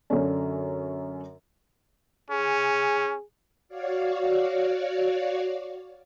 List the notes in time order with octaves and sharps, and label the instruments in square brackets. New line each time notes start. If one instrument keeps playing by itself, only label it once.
[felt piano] F#2 D3 C#4
[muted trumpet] C#4 [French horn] G#4
[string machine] F#4 C#5 D5 F5